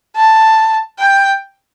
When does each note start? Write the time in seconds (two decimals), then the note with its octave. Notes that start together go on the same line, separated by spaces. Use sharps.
0.16 A5
0.99 G5